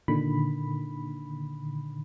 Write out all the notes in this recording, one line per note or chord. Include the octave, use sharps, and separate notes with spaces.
A#2 D3 D#3 B5